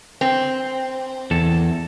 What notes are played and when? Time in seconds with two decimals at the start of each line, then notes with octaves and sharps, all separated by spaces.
0.21 C4
1.31 E2 A4